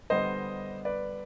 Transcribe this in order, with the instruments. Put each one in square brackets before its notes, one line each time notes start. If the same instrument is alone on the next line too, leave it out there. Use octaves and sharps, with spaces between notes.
[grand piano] D3 G3 B3 C5 D#5
B4 D5